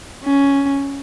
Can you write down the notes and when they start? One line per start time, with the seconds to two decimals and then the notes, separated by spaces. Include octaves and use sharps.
0.24 C#4